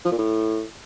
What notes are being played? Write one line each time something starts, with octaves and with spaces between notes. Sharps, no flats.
F3
A#2
A2